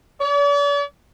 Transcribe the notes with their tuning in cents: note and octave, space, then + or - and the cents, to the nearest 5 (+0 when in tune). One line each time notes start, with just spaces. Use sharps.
D5 -45